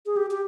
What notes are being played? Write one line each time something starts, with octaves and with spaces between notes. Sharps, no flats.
G#4
G4
G4